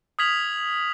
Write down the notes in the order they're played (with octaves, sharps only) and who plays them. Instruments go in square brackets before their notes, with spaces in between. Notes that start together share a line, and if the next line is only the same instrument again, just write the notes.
[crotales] D#6 F6 G#6 B6 F7 F#7